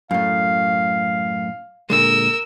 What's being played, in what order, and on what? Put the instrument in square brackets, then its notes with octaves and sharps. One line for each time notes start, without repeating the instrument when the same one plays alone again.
[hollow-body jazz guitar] F#2 A2 [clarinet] F5
[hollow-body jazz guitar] A#2 D3 G#3 [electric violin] A#4 E6